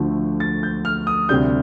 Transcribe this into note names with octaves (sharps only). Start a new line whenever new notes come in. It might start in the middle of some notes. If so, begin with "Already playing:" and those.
Already playing: D2 D3 F3 A3
A6
G6
F6
D#6
D2 C3 G3 D4 G6